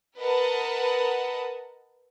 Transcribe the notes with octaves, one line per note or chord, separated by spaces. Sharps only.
A#4 B4 D#5 F#5 A5